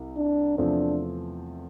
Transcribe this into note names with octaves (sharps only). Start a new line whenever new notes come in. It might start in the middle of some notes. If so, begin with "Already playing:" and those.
Already playing: C2
D4
E2 C3 F3 A3 C4 D4